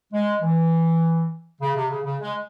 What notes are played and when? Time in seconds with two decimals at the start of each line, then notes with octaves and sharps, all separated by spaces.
0.13 G#3
0.42 E3
1.61 C#3
1.75 C3
1.90 C#3
2.05 C#3
2.21 G#3